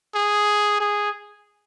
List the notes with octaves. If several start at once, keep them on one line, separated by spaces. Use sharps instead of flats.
G#4
G#4